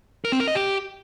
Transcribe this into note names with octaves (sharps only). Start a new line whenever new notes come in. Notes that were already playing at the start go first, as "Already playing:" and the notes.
A#4
C4
A#4
D#5
G4